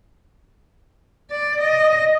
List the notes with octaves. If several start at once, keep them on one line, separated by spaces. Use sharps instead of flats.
D5
D#5